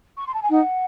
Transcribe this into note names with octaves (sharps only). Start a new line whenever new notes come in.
C#6
C6
A5
G#5
D#4 F#5